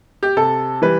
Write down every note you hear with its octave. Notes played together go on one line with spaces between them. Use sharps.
G4
C3 A4
E3 G3 B4